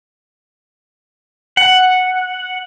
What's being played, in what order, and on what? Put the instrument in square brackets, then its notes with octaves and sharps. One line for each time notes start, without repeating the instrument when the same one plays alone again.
[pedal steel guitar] F#5